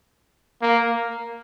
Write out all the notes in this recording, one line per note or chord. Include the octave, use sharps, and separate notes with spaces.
A#3